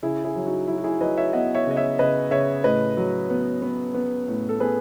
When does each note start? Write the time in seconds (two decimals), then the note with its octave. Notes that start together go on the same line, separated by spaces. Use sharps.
0.02 C#3 E4 G#4
0.25 E4 G#4
0.36 F#3
0.47 D#4 F#4
0.68 F#3 E4
0.78 F#4
0.84 E4 G#4
1.01 F#3 B4 D#5
1.17 C#5 E5
1.33 B3 D#5 F#5
1.55 C#5 E5
1.67 C#3 D#5
1.76 C#5 E5
1.99 C#3 B4 D#5
2.31 C#3 C#5 E5
2.64 A2 B4 D#5
2.97 F#3
3.30 B3
3.62 B3
3.94 B3
4.28 A2
4.49 A4
4.60 B3 G#4 B4